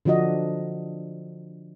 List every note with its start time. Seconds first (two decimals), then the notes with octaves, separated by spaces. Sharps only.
0.05 D3 F3 D4 F#4 D#5